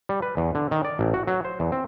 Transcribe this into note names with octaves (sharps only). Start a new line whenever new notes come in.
G3
B4
E2
D3
D#3
D5
A1
F#4
F#3
C5
E2
C4